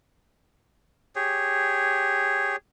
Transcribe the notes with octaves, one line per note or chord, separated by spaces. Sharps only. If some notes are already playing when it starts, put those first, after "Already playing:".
G4 G#4 C#5